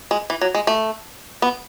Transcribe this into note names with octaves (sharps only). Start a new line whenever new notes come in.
G#3
E3
F#3
G#3
A3
B3